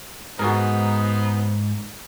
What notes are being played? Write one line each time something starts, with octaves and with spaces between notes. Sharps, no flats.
G#2 B3 D#4 F#4 G#4 A#4 C5